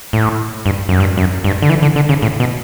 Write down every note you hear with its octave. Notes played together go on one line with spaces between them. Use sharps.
A2
G2
F#2
G2
F#2
G2
D3
E3
D3
D3
C#3
A2
B2